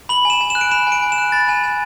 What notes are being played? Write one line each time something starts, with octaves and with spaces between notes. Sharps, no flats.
B5 F#7
G#5 E7
G#5
F#6 E7
D7
B5 E7
G#5
D7
G#5
E7
F#6
B5 A6
G#5
G#5